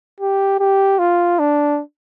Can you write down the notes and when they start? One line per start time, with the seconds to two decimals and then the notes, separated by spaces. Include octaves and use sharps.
0.20 G4
0.60 G4
0.99 F4
1.39 D4